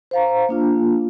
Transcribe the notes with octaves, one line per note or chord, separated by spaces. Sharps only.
C5 F5 A#5
A#3 D4 F4